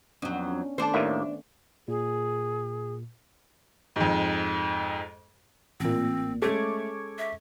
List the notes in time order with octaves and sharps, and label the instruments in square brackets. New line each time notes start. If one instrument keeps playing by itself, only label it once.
[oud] F2 F#3 [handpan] B3 C#4 D4
[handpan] C#4 D4
[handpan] D#3 A3 B3 [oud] D4 C5 [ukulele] A4 A5
[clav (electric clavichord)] D#2 A2 A#3 [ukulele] E5
[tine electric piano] A#2 [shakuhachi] G#4
[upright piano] F2 G#2
[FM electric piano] A1 A#2 [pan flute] C4
[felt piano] G#3 C#4 A4 [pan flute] A3 [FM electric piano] C#6 D6 G#6
[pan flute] E5